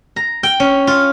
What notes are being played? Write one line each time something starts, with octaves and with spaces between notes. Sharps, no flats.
A#5
G5
C#4
F4